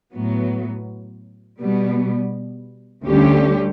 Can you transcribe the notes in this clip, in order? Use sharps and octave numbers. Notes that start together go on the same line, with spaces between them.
A2 F#3 B3
B2 G3 B3
D2 D3 G3 C#4 G4